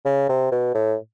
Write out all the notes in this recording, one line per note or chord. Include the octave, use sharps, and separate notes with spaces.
C#3
C3
B2
A2